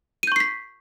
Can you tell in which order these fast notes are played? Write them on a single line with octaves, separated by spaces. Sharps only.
D#7 G6 C#6 C7 B6